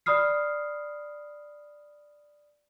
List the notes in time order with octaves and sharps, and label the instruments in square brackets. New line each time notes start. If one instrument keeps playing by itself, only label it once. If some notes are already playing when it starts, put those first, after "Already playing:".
[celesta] D5 B5 D#6 F6 C7